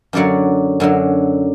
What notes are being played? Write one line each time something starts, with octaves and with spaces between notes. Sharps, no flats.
F#2 D3 F#3 D5 F#5
F#2 D3 F#3